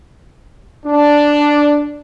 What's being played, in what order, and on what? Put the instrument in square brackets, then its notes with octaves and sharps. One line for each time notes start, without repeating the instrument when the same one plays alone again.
[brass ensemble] D4